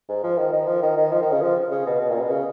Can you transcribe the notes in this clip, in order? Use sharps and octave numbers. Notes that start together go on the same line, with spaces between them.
G#2
F3
D#3
D#3
F3
D#3
D#3
F3
D#3
C#3
F3
C#3
B2
B2
A#2
B2
C#3